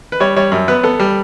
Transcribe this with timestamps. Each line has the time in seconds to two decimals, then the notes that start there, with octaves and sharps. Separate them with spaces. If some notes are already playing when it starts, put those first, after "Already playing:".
0.12 B4
0.20 G3 C#5
0.36 G3 C#5
0.52 F#2
0.68 B3 B4
0.83 B3 A4
1.00 G3